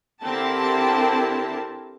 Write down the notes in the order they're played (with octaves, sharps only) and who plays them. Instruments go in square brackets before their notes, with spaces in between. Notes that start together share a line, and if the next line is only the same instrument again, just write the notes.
[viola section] D3 C4 E4 G4 A#4 A5